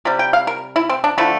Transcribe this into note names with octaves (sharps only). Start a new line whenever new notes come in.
C3 G3
G5
F5
A#4
E4
C4
D4
D3 F3 A3 E4